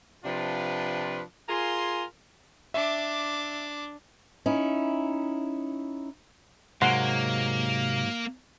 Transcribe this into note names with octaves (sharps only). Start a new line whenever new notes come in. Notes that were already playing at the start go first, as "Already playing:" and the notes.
C3 F3 D4 F4 B4
F4 G#4 A#4 G#5 C6
D4 E5 D6
C#4 D#4 E4
G#2 C3 F#3 A#3 F#5 C6